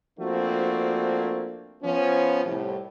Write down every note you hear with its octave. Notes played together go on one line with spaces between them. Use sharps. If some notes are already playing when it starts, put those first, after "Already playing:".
F3 A3 A#3 C4 D4 F#4
F3 B3 C#4
C2 A2